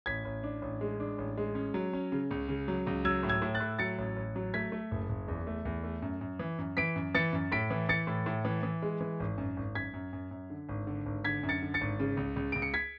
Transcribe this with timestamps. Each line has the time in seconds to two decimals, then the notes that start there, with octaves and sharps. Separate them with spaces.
0.06 A1 G#6 B6
0.25 A1
0.44 D4
0.62 A1
0.81 G#3
1.00 D4
1.18 A1
1.38 G#3
1.55 C#4
1.74 F#3
1.93 C#4
2.12 C#3
2.31 C#2
2.48 C#3
2.68 F#3
2.87 C#2
3.05 F#3 E6 G#6
3.23 A2
3.29 E6 G#6
3.42 A2
3.54 F#6 A6
3.60 A2
3.79 F#3 A6 C#7
3.98 A1
4.16 A1
4.36 F#3
4.54 A3 G#6 B6
4.72 A3
4.91 F#1
5.09 F#1
5.28 E2
5.47 A3
5.65 E2
5.84 A3
6.02 F#2
6.21 F#2
6.39 E3
6.58 F#2
6.77 E3 B6 D7
6.96 F#2
7.15 E3 A6 C#7
7.33 F#2
7.52 A2 B6 D7
7.70 E3
7.89 E3 A6 C#7
8.07 A2
8.26 A2
8.45 E3
8.63 E3
8.82 G#3
9.01 E3
9.20 G#1
9.38 F#2
9.57 G#1
9.75 F#2 G#6 B6
9.94 F#2
10.13 F#2
10.31 F#2
10.50 D3
10.69 G#1
10.87 D3
11.06 G#1
11.25 D3 G#6 B6
11.43 F#2
11.49 A6 C#7
11.62 D3
11.74 A6 C#7
11.81 G#1
12.00 C#3
12.17 C#2
12.36 C#2
12.52 C#2 D7
12.62 C#7
12.74 G#6 B6